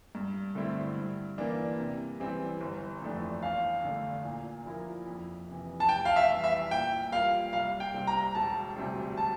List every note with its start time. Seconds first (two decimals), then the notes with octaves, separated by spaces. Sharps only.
0.15 G2
0.55 D3 A3 C4 E4
0.96 G2
1.38 E3 A#3 D4
1.78 C3
2.20 E3 G3 C4
2.61 G1
3.02 F2 E3 A3 D4
3.42 E2 F5
3.84 D3 A3
4.24 A#2
4.66 F3 A#3 E4 A#4
5.07 F2
5.48 C3 E3
5.80 A5
5.89 F1 G5
6.05 F5
6.16 E5
6.30 E2 E3 G3
6.44 E5
6.71 A#2 G5
7.12 G3 A#3 F4 F5
7.53 C2 F5
7.80 G5
7.94 C3 G3 C4
8.07 A#5
8.35 E1 A5
8.76 D2 C3 G3 C4
9.17 A5